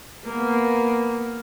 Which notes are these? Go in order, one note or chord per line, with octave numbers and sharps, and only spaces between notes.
A#3 B3